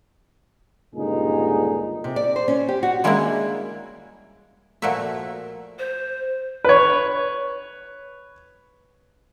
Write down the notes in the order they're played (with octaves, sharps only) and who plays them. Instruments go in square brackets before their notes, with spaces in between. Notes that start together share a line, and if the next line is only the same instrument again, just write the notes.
[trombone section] C#2 G2 A#2 D3 D#4 G#4
[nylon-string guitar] C3
D5
C5
C#4
G4
F#4
[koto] G3 G#3 A#3 C#4 D4 E4
A#2 F3 A3 F#4 A#4 E5
[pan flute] C5
[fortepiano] B4 C#5